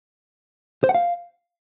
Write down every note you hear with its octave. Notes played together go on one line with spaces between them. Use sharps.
C5
F#5
F5